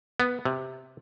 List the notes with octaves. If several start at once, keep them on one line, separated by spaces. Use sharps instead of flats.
B3
C3